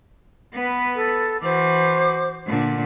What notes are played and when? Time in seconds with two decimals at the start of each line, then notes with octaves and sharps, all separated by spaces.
0.54 B3 B4
0.95 A4
1.42 E3 F#4 C5 D6
2.47 A#2 D3